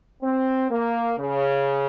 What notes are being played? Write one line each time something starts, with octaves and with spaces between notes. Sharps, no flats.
C4
A#3
C#3